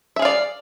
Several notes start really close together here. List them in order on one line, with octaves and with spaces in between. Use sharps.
E5 G#4 F5 D5